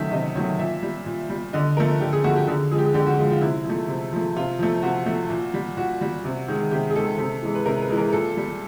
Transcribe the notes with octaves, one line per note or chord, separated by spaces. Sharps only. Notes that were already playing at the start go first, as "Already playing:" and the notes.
Already playing: C3 D#3 F#3 A3 E5
C3 D#5
D#3 F#3 A3 C#5
A#2 E5
G3
A#2
G3
D3 D#5
F3 A3 A#4
D3 G4
G#4
F3 A3 F#4
G4
D3 G#4
F3 G#3 G#4
G4
G#4
D3 G4
F#4
F3 G#3 F4
F4
C3 E4
F3 A3
C3
F3 A3
C3 F4
F3 A3
C3 F#4
F3 A3
A#2
G3
A#2 F#4
G3
C3
D#3 G#3
C3 G4
G#4
D#3 G#3 A4
C3 A4
E3 G#3
B4
C3 A#4
B4
E3 G#3
A#4
A#2 A4
G3